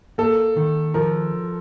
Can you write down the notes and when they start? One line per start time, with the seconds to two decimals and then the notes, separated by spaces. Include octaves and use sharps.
0.18 A#3 A4
0.57 D#3
0.94 F3 A#4